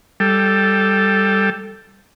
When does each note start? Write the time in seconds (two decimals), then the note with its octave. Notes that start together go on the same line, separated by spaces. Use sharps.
0.20 G3 A4